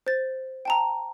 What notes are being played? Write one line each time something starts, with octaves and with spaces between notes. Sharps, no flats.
C5 A6
G5 A5 A#5